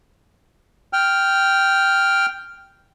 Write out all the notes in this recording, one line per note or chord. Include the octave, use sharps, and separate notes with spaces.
G5 F6